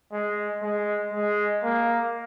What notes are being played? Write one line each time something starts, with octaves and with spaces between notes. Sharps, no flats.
G#3
G#3
G#3
A#3